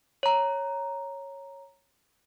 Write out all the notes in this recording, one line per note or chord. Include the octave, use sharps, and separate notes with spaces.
C#5 A#5